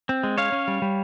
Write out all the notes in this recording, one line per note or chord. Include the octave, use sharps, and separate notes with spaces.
C4
G#3
C#4 C#5 F5
C#4
G3
G3